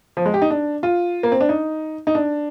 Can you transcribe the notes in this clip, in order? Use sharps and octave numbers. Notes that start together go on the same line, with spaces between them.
F3
G#3
G4
D#4
D4
F4
A#3
C4
D4
D#4
D#4
D4